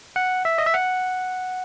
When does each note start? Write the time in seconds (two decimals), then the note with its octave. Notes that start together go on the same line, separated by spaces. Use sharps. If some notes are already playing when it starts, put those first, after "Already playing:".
0.16 F#5
0.45 E5
0.58 D#5
0.66 E5
0.74 F#5